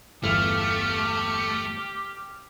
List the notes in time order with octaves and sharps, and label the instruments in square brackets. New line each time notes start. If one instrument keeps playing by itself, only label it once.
[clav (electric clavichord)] G1 E2 E4 [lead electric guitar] A3 [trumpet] G4 [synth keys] F6